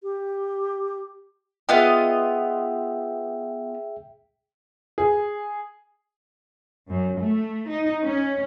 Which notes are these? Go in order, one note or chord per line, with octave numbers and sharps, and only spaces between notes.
G4
B3 F4 G#4 D#5 E5 G5
G#4
F#2
A3
D#4
C#4